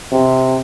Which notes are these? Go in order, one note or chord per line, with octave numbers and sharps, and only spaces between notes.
C3